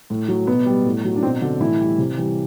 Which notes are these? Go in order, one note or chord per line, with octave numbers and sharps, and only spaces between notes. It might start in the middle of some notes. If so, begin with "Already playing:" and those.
A2
F#3
B2 B3
G3
A2
F#3
D4
B2 C4
D3 F#3 D4
A2 E3 E4
G3
C3
E3 G3